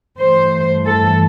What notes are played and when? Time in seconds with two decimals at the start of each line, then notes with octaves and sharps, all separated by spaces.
0.19 G2 E3 A3 C5
0.86 A4